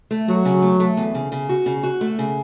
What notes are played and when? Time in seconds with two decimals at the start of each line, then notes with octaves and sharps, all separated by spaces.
0.11 A3
0.28 F#3 F#4
0.45 C#3
0.62 A3
0.80 A3
0.97 E2
1.15 C#3
1.32 C#3
1.49 F#4
1.66 C#3
1.83 F#4
2.01 A3
2.19 C#3